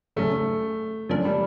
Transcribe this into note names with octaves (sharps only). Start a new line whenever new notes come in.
G#1 F#2 C#3 A3
F#2 C#3 F3 A#3 D4
G3